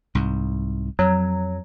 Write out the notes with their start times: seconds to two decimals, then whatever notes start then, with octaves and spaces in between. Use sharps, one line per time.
0.15 C2 G#2
0.99 F2 F#3